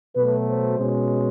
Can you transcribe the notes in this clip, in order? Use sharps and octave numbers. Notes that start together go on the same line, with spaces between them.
B2 F#3 A3 B4
C5
B2 G#3 C#4